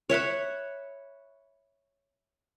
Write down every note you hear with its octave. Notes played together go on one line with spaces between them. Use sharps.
C#5 E5 F#5 B5